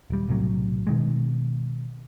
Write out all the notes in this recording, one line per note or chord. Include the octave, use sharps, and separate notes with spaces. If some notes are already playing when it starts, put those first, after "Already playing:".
D#1 G3
B1 A2 C3 F#3
B2 D#3 G#3